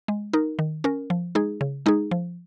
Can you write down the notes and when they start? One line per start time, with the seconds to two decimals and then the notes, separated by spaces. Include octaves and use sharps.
0.08 G#3
0.33 D#4 A#4
0.59 D#3
0.84 C#4 A#4
1.10 F3
1.35 G#3 D#4 G#4
1.61 C#3
1.86 G#3 D#4 G#4
2.11 F3